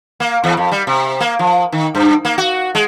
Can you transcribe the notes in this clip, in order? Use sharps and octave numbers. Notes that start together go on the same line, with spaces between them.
A#3
E2
F2
G3
C3
A#3
F3
D#3
G2
A#3
F#4
G#3